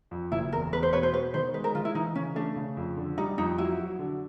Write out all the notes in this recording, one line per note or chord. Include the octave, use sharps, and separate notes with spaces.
F2
F#1 E4
E2 A#4
E2 B4
C5
B2 B4 C#5
C5
B3 B4
D#3 C5
G#3 B4
A#4
D#3 F4
E4
E3 D#4
C#3 C#4
A3 D4
C#3
F2
D3
G3 D#4
F2 D#4
F#3 E4
F#3
D3